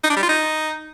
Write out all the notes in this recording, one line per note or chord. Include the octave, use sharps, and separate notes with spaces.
D#4
D4
G3
F4
D#4